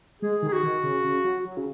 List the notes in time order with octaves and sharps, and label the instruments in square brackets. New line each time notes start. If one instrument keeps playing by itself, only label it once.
[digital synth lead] G#3 [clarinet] G#4
[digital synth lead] D#3
[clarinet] G#4
F#4
[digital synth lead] D#3
C#3
C#3
F#3
F#3
C#3